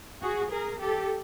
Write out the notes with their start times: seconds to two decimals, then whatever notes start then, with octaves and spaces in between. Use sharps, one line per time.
0.22 F#4 G#4
0.52 G#4 A#4
0.81 G4 A4